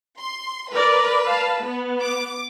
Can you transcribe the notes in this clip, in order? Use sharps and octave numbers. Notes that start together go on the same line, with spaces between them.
C6
A#4 B4 D5
F5 A5
B3
D6